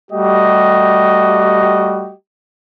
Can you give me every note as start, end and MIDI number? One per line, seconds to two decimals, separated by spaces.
0.12 2.13 55
0.12 2.13 57
0.12 2.13 66
0.12 2.13 67
0.12 2.13 75